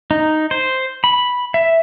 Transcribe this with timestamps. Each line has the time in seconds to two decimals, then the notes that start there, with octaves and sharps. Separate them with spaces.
0.11 D#4
0.51 C5
1.04 B5
1.54 E5